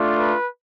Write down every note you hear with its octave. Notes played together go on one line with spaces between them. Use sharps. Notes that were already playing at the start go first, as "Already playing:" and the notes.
Already playing: A3 D4 F4
B4